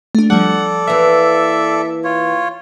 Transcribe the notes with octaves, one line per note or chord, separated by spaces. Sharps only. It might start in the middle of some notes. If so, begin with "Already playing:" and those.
A3 D4
F3 G3 A4 D5 F#5
E3 A#3 E5
F4 C#5